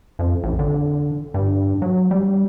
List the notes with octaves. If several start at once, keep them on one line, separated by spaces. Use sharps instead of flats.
F2
A1
D3
G2
F#3
G3